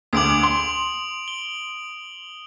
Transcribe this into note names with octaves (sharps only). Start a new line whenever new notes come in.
D2 D6 D#6 D7 F#7
C6
G7